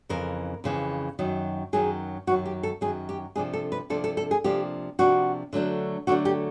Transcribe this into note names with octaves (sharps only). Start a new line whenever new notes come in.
F2 C#3 E3 A#4
F2 C#3 E3
F#2 D#3 F#3
F#2 D#3 F#3 G#4
F#2 D#3 F#3 F#4
G4
A4
F#2 D#3 F#3 G#4
G4
C3 F3 A#3 D4 G#4
A4
B4
C3 F3 A#3 D4 A4
A4
A4
G#4
C3 F3 A#3 D4 G4
C3 F3 A#3 D4 F#4
D3 F#3 A3 D4
D3 F#3 A3 D4 F#4
G4